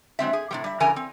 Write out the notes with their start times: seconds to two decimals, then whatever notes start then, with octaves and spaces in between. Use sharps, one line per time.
0.19 F#3 G#3 C4 E5
0.33 G#4
0.51 A2 C3 G3
0.64 G3 E5
0.80 G2 C#3 E3 A#4 G#5 A#5
0.96 C4